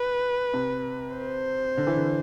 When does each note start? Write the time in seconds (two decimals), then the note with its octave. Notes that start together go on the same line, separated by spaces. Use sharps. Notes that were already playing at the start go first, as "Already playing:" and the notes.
Already playing: B4
0.54 C3
1.15 C5
1.77 D3
1.87 E3
1.96 D3